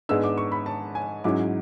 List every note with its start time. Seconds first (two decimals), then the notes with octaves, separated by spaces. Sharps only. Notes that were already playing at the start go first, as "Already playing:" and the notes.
0.09 G#2 G#3 B3 D4 E6
0.24 D6
0.38 C#6
0.52 B5
0.66 A5
0.95 G#5
1.24 G#2 F#3 C#4 E4 D6